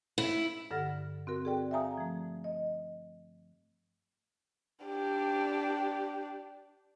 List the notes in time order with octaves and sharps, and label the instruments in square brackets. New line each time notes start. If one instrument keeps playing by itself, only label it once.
[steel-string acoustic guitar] E4
[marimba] G2 D3 A4 F#5 F6 A#6
C4 F#4 A#4
G#4 A4 D5 G5
E5 F5 G#5 A#5 D#6
F3 A3
D#5
[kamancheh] D4 G4